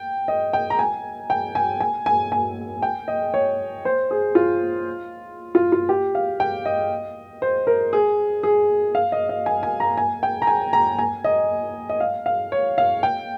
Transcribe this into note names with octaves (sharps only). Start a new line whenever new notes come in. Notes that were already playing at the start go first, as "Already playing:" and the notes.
Already playing: G5
D#5
G5
A#5
G#5
G5
G#5
G#5
G#5
G#5
G5
D#5
C#5
C5
G#4
F4
F4
F4
G4
F5
G5
D#5
C5
A#4
G#4
G#4
F5
D#5
D#5
G#5
G#5
A#5
G#5
G5
A#5
G#5
A#5
G#5
D#5
D#5
F5
F5
C#5
F5
G5